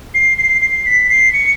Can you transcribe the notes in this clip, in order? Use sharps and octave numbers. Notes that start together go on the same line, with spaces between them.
C7
C7
C7
B6
C7
C#7